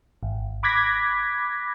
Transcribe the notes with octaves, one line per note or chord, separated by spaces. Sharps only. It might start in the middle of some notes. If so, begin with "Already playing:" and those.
G#1
B5 D6 F#6 G#6 A#6 B6